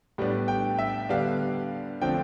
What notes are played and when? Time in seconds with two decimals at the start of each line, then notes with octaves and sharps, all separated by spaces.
0.18 A2 G3 B3 D4
0.48 G5
0.79 E5
1.09 D3 G3 B3 D4 F5
2.01 D3 F3 A3 C4 G5